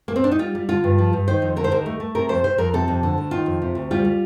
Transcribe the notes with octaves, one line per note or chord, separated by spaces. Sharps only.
A#3
C4
D4
D#4
G3 F4
G3
D3 F4
G2
F3
G2
D#3 C5
F2
D3 A#4
C5
D#2 A#4
A3
A3
C3 A#4
F2 C5
C3 C5
F2 A#4
C3 A4
F2
D3
D2
D#3 F4
F2
C3
D2
G3 F4
G3